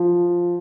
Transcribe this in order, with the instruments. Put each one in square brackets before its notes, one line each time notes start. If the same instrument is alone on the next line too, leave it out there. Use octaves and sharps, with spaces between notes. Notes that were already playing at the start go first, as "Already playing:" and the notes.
Already playing: [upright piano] F3